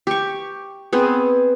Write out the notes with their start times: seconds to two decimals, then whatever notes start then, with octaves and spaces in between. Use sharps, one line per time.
0.07 G4 C#6
0.93 B3 C4 G#4